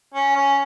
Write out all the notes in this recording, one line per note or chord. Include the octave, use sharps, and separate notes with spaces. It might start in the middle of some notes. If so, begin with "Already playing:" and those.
C#4
C#4